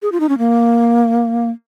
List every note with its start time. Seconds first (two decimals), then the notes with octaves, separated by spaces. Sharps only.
0.02 G#4
0.12 F4
0.20 D#4
0.29 C#4
0.38 A#3